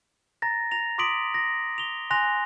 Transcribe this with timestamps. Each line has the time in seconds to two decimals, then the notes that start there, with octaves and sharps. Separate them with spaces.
0.42 A#5 A6 A#6
0.72 A#5 A#6 F7
0.98 C6 D6 D#6 B6 D7 F#7
1.34 A#6
1.78 F7 G7
2.10 G#5 C6 F#6 A#6 F7